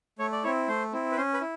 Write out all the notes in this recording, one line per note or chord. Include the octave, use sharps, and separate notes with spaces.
A3 C#5
D5
C4 E4 C#5
A3 C5
C4 E4
B4
C#4 C5
B4
E4